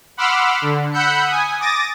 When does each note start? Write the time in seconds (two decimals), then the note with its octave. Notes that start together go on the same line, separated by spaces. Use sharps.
0.17 F#5 B5 C6 D6 E6 F6
0.62 D3
0.92 F#5 B5 E6 F#6 G6 C#7
1.26 G#5 D#6
1.60 D6 D#6 A6 A#6